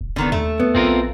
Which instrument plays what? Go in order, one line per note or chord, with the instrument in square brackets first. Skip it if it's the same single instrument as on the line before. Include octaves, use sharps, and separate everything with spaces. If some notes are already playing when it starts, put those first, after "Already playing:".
[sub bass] D#1
[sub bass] E1 [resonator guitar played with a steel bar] D3 D#3 B3
[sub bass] D#2 [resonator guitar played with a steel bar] A3
[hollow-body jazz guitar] B3
[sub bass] A#1 [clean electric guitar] C4 F4 A#4